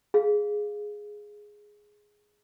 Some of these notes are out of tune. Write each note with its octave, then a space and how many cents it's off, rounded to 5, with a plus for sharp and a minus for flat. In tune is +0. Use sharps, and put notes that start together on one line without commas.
G#4 +0 F5 +0